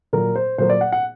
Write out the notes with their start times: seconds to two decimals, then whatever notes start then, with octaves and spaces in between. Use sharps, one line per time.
0.13 A#2 F#3 A#3 A#4
0.36 C5
0.58 A#2 F#3 A#3 C5
0.70 D5
0.81 F#5
0.92 F#5